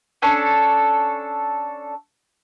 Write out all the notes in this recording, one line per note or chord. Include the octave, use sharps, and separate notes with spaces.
C#4 D4 A4 C#5